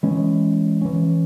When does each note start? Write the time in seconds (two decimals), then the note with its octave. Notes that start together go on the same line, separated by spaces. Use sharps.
0.03 E3 G#3 C#4
0.82 E3 C#4